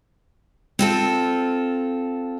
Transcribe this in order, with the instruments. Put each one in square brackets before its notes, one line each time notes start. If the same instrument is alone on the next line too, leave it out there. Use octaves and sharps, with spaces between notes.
[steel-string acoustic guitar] C4 F4 A4